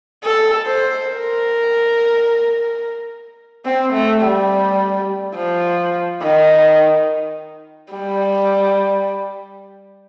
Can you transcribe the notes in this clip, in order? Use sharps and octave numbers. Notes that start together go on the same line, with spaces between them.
A4
C5
A#4
C4
A3
G3
F3
D#3
G3